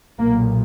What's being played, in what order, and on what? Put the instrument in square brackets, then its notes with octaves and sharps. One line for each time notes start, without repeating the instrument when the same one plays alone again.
[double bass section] B1 A#2 A#3